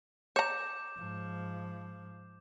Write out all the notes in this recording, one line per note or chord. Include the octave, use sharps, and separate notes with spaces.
C#5 A#5 D6 G6 E7
G#2 F3